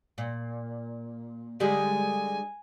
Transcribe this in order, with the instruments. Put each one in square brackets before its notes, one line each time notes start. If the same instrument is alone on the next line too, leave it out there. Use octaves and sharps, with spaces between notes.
[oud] A#2
[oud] D3 G3 G#3 [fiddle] G#5